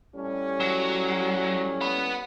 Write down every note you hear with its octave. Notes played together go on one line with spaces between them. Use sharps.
A2 G3 C#4
F#3
F#5 B5